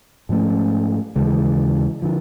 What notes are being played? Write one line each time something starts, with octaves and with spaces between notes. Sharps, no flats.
G#2 F3 A3 C#4
D#2 C#3 E3 G#3
D3 F3